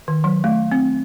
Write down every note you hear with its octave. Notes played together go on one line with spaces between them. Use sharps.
D#3
F#3
A3
C4